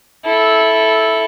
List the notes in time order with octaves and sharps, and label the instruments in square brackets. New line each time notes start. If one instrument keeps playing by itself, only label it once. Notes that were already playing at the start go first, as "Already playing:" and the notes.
[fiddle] E4 A4